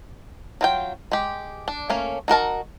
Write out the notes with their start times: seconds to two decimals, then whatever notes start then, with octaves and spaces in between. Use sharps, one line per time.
0.61 F#3 F4 G5
1.12 G#3 G4
1.68 D4
1.90 A3 A#3 C#4
2.28 D#4 F#4 A#4 A5